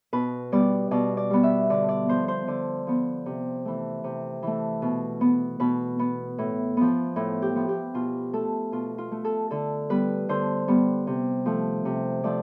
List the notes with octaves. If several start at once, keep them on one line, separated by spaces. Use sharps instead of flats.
B2 B4
G3 B3 D5
B2 D5
D5
G3 B3
E5
D3 D5
D5
F3 B3 C5
C5
D3 D5
F3 B3
C3
E3 A3
C3
E3 A3
B2
B3
B2 B4
B3
A2
F3 B3
A2
G4
F3 B3
G4
B2 F4
A3 A4
B2 F4
F4
A3
A4
D3 A4
G3 B3 B4
D3 C5
G3 B3
C3
F3 A3
C3
F3 A3 D5